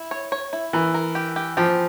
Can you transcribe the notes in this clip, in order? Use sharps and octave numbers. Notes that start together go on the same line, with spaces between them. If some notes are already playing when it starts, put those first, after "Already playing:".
Already playing: E4
C#5
C#5
E4
E3 A#4
A#4
G4
G4
F3 G4